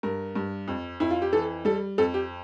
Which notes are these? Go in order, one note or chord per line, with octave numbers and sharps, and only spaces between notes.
G2 A#4
G2
F2
F2 E4
F4
G4
E3 A4
G3 A4
F2 A4
G4